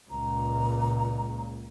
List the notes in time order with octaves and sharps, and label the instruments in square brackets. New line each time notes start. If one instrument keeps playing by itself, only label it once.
[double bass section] C#2 A#2 [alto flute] A#5